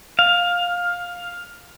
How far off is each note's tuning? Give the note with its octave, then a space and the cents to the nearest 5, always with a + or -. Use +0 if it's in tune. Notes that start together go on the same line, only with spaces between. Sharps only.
F5 +15